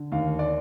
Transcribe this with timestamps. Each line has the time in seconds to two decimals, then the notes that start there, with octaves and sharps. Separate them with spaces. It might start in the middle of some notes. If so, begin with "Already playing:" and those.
Already playing: D3
0.12 D#2 F5
0.39 D5